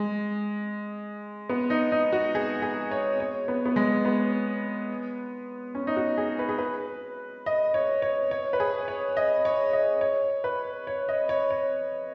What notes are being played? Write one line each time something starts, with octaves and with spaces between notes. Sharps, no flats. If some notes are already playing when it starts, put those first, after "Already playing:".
Already playing: G#3
B3
D#4
D#4
F#4
G#4
G#4
C#5
C#5
B3
B3
G#3
B3
C#4
D#4
F#4
G#4
B4
G#4
B4
D#5
C#5
C#5
C#5
B4
G#4
C#5
D#5
C#5
D#5
C#5
B4
C#5
D#5
C#5
C#5